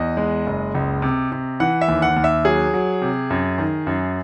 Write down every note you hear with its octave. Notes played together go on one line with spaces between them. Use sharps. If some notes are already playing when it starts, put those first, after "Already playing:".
Already playing: E2 D#5
G#3
F#1
C#2
C3
C3
E3 F#5
E5
D#2
F#5
D#2
E5
F#3 G#4
F#3
C3
F#2
D#3
F#2